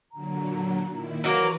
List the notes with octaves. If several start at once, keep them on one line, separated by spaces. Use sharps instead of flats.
A#2 D3 F#3 A#5
A#2 D#3 E4
E3 F#3 A#3 F#4 B4